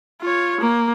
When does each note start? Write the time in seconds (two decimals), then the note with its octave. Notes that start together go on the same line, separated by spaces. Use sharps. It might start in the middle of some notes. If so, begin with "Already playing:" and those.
0.22 F4 C#5
0.60 A#3